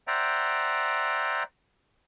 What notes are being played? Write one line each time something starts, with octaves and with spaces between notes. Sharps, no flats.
C5 D5 E5 F#5 G5 A#5